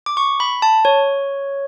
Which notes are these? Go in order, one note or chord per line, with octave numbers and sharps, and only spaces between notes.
D6
C#6
B5
A5
C#5